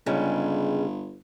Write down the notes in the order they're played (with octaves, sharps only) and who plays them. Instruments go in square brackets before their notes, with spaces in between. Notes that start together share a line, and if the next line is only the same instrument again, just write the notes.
[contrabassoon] G1 [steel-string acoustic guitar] C#3 G3 G#3